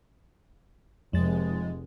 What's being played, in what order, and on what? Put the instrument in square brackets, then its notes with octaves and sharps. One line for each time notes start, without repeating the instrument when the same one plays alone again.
[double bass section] F1 [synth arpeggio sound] F2 [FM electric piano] F3 A6 [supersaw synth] G#3